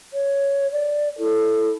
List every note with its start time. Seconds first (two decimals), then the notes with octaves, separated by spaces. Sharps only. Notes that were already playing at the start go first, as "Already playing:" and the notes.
0.13 C#5
0.72 D5
1.19 E4 A4